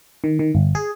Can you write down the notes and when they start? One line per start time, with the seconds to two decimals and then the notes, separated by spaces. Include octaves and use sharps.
0.24 D#3
0.39 D#3
0.55 G1
0.75 G#4